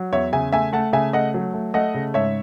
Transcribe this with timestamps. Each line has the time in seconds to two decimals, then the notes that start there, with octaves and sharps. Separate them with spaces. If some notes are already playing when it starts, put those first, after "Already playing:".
Already playing: F#3
0.12 E2 C#5 E5
0.33 C#3 E5 G#5
0.52 A3 E5 G#5
0.73 A3 F#5 A5
0.93 C#3 E5 G#5
1.13 A3 D#5 F#5
1.34 F#3
1.54 A3
1.74 A3 D#5 F#5
1.94 C#3
2.14 G#2 C#5 E5